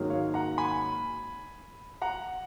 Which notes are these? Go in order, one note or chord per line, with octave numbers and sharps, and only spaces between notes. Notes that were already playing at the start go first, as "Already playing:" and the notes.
Already playing: G#2 D#3 F#3 A#3 C#4
C#5 F5
F#5 A#5
G#5 B5
F#5 A#5